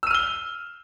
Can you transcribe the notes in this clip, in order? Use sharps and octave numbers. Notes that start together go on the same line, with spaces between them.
E6 F6 D#7 G7